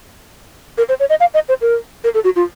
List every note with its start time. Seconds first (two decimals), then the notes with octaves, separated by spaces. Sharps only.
0.78 A#4
0.89 C5
1.00 C#5
1.10 D#5
1.20 F5
1.34 D#5
1.49 C5
1.61 A#4
2.04 A#4
2.14 A4
2.24 F#4
2.36 F4